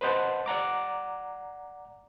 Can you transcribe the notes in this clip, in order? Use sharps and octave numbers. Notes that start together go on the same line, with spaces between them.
B4 C5 D#5 F#5 A5
D5 F#5 A#5 D6